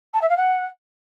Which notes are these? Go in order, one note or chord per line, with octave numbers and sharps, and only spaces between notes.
A5
E5
F5
F#5